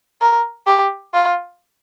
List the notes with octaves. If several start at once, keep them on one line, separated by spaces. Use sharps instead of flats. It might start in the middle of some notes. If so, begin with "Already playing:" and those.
A#4
G4
F4